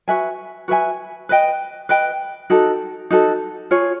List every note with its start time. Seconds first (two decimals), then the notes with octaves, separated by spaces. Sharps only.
0.08 F#4 B4 E5 G#5
0.68 F#4 B4 E5 G#5
1.29 B4 D#5 G5
1.89 B4 D#5 G5
2.50 D#4 F#4 A4
3.11 D#4 F#4 A4
3.71 F4 G#4 C#5